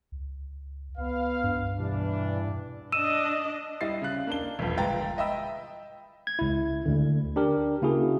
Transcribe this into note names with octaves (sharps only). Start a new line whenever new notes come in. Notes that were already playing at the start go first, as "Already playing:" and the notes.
C#2
C#2 B3 B4 F5
G2
B2 E3 G3 D4
D4 D#5 E6 D#7 E7
G3 E4 D#5 A6 C7
C#3 F5 F#6
A#3 D4 G7
E1 A#1
G1 G#3 B4 G5 A#5 A6
D#5 E5 G5 B5 E6
G#6
C#2 E4
D2 D3
D4 G4 A#4
C#3 A#3 E4 F#4 G#4